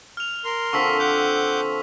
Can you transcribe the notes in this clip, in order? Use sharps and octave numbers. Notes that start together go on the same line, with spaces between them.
F6 F7
A#4 C6
D3 F3 C4 C#6 E6 B6
F#5 D6 G6